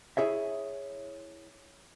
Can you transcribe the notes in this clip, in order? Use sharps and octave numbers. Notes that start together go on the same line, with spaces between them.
E4 G#4 C#5 E5